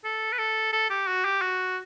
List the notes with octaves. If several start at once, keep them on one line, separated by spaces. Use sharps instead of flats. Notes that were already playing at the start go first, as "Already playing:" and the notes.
A4
B4
A4
A4
G4
F#4
G4
F#4